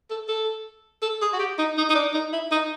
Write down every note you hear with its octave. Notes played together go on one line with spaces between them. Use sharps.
A4
A4
A4
G#4
F#4
G4
D#4
D#4
D#4
D4
D#4
E4
D#4